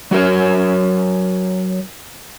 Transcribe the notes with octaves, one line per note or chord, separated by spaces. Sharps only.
F#3 F#4 A#4 C#5